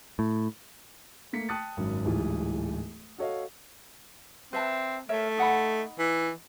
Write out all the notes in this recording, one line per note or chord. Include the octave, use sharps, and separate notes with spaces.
A2
A3 A#3 B6 C#7
G5 A5 D#6 F#6 A6 C#7
G#1 F#2
D1 G#2 E3 G3 F4
F#4 A4 C#5 D#5 F5
C4 B4 E5 A5
A3 A#4 C#5 E5
D#4 F#5 B5
E3